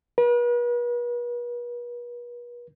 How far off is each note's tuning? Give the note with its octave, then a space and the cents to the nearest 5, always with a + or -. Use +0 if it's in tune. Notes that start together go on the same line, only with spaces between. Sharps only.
B4 -40